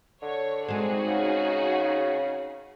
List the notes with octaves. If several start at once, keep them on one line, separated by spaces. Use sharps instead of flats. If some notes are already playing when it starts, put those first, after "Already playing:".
D3 C#5
G#3 C4 D#4 F#4 G#4
C#3